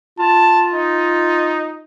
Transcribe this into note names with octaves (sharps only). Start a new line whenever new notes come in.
F4 A5
D#4